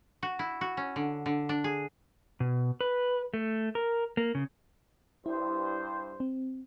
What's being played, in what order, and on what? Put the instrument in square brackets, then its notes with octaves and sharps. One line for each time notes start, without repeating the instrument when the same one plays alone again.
[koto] F#4
E4
F#4
C#4
D3
D3
D4
G#4
[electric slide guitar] B2
B4
A3
A#4
A#3
C#3
[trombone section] G2 C5 [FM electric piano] E4
[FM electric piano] C4